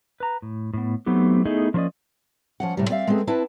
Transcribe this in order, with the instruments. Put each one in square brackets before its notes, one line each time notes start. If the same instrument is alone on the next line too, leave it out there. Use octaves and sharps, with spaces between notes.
[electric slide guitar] B4 A#5
A2
A2 B3
F#3 A3 B3 C4 D#4 G4
A3 B3 D#4 E4 G#4 D#5
F3 F#3 A#3 C#4 D5 D#5
[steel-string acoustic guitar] F3 C#4 F#5
A2 C3 G3
C4 D5 E5 F5
G#3 A3 B3 C4 G#4
C4 D4 E4 B4 A5